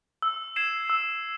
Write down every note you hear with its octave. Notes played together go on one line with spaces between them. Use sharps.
E6
G#6 C7 E7
E6